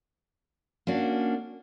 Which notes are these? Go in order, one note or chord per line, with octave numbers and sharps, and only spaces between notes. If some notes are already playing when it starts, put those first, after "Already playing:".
A#3 C#4 D4 F#4